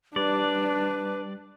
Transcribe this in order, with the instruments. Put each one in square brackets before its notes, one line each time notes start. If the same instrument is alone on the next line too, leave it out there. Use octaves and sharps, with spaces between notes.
[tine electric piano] G3 [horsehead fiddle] D4 [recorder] B4 [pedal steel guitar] D5